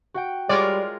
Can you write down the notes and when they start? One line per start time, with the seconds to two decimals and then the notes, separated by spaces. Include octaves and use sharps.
0.14 F#4 F#5 G5
0.49 G3 G#3 F4 A#4 C#5 D5